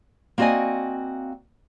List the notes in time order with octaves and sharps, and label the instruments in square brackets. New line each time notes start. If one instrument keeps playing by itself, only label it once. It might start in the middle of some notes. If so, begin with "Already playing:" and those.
[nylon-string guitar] A#3 C4 F#4 D5 D#5 G#5